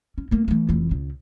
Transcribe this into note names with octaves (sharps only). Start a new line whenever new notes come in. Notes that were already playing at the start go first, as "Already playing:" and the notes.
C#4
A3 A#3
E3 A3
F1 E3
C#2 C#3